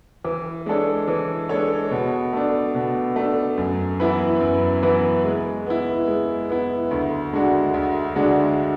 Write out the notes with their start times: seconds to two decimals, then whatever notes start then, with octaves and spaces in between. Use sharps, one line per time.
0.24 E3
0.66 G#3 D4 A4 C#5
1.08 E3
1.49 G#3 D4 A4 C#5
1.91 B2
2.33 A3 D4
2.75 B2
3.16 A3 D4
3.58 F#2
4.00 E3 B3 E4 B4
4.41 F#2
4.83 E3 B3 E4 B4
5.25 G#3
5.66 B3 E4
6.08 G#3
6.49 B3 E4
6.91 D2
7.33 D3 G#3 D4 F#4
7.74 D2
8.16 D3 G#3 D4 F#4